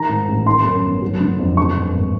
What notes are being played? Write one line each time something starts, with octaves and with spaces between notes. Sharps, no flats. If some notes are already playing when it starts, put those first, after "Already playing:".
Already playing: D#3 A#5
G#2
A1
D#3 C6
F#2
G1
F#3
D3
F2
D3 C#6
G2
G#1